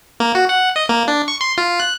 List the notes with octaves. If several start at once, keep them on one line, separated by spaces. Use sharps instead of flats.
A#3
F#4
F#5
D#5
A#3
D4
C#6
C6
F4
F#6